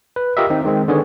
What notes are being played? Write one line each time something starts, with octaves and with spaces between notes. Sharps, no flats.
B4
F4 G4 A#4 D#5 E5
D#3 C4 D#4
D#3 G#3 C4
D3 D#3 B3 G#4 C#5